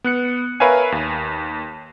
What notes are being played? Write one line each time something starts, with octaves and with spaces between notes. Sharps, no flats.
B3 F#6 C#7
A#4 B4 C#5 E5 F5 G#5
D#2